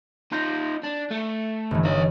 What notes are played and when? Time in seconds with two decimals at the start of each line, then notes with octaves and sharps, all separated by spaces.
0.32 D#4 F4 F#6 G6 A#6
0.83 D4
1.11 A3
1.71 G1 E3
1.85 D#4 C#5 D#5